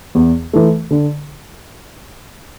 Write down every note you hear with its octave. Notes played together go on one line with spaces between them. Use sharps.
E2
E3 A3
D3